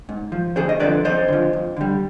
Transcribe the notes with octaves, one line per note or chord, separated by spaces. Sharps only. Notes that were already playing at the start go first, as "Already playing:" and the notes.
G#2
F3
D2 G#4 C5
D#5
D3 F3 B4 D5
F2 C5 D#5
D3 F3
F2
D3 G3